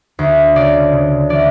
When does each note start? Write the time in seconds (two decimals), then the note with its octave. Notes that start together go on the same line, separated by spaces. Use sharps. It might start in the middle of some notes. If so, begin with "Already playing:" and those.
0.19 D2
0.55 C#3 D5
0.93 C#3
1.29 E3 D5